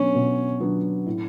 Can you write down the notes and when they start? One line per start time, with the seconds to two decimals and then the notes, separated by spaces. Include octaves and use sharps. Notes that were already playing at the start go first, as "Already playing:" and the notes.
Already playing: B2 F#3 B3 C#4 D4
0.15 B2
0.60 F#3 B3 D4
1.06 A2